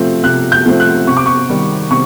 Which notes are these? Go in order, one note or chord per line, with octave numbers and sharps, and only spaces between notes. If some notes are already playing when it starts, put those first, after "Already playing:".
Already playing: C3 F3 A3 C4
C3 F#6
G6
F3 A3 C4
F#6
C3 C#6
D6
C#6
D#3 G3
C3 C#6